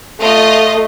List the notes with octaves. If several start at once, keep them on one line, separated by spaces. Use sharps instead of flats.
A3 F4 D#5